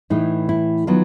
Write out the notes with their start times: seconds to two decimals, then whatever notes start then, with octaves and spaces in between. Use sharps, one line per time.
0.10 A2 E3 A3 D#4
0.49 E4
0.87 D#3 F#3 B3 F4